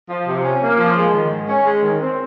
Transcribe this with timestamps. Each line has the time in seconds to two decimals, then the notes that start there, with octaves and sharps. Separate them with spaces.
0.09 F3
0.26 C3
0.44 C#4
0.61 A#3
0.78 F3
0.96 G#3
1.14 D#3
1.30 G#2
1.49 C#4
1.65 G#3
1.83 D#3
2.01 C4